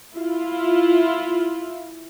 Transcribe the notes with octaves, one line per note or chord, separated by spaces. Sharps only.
E4 F4